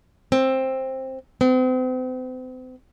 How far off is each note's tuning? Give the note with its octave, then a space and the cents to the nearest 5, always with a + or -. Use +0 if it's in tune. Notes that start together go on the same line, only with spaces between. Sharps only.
C4 +10
C4 -40